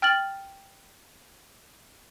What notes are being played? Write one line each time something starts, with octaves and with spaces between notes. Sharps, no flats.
G5 F6 A6 F#7